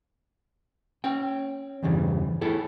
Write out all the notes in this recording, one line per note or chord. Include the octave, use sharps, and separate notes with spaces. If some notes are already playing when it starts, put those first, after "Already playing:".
C#4 G5
E2 G2 C#3 E3
E4 G#4 A4